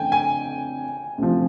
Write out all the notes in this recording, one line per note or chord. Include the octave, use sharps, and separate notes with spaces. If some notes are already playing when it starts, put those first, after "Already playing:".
Already playing: F2 C#3 E3 A3 D4 G5 G#5
G#5
D2 C3 F3